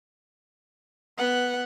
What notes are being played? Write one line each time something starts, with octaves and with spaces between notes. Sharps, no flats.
B3 F#5